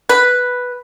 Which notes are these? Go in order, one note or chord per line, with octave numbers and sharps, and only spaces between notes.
B4